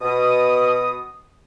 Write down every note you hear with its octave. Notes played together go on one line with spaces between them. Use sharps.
B2 D#6